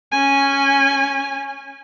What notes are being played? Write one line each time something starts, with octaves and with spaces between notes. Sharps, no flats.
C#4 G#5